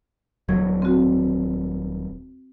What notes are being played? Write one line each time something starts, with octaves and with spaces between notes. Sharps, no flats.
D#1 F#3 G#6
C4 F#4